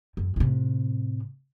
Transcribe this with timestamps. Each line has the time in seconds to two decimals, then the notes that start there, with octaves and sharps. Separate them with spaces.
0.17 F#2
0.36 A2 C3